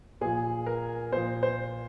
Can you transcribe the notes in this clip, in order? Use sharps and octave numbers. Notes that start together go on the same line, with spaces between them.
A#2 F3 G#4
A#4
A#2 F3 C5
C5